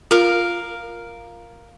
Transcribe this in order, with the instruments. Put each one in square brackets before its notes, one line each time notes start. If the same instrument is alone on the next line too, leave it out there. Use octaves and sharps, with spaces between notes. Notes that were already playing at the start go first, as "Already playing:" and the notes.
[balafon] F4 [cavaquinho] A#4 F5